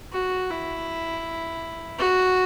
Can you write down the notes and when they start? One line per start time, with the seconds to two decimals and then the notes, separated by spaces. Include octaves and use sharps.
0.13 F#4
0.50 E4
1.98 F#4